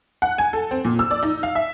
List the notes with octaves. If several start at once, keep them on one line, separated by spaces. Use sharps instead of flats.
F#5
G#5
A4
C4
A#2
E6
D5
D#4
F5
E5